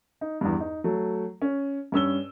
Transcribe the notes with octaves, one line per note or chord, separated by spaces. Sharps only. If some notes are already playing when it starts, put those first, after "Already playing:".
D#4
E2 G2
D#4
F#3 A3
C#4
G2 C#4 E6 G7